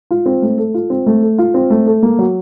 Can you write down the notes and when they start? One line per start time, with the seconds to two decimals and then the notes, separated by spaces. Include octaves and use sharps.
0.11 F4
0.26 C4
0.42 A3
0.58 A4
0.74 F4
0.90 C4
1.06 A3
1.22 A4
1.38 F4
1.54 C4
1.70 A3
1.86 A4
2.03 A#3
2.19 F#3